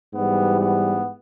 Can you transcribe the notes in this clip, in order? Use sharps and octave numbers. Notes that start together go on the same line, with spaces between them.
G#2 E3 G3 B3
B3